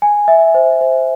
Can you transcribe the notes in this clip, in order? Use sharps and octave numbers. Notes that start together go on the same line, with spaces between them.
G#5
E5
C5
C5